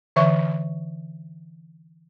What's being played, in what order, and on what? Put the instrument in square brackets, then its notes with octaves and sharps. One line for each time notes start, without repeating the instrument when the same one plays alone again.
[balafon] D3 E3 E5 C#6